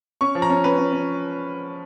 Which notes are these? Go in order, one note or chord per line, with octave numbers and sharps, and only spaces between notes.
C#4 C#6
F3
A#5
C#4
C#4 B4
C#4
C#4